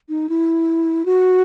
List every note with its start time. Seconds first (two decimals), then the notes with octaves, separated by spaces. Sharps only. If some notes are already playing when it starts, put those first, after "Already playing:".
0.09 D#4
0.29 E4
1.05 F#4